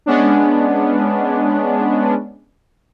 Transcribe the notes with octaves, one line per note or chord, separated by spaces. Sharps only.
G#3 B3 C#4 D4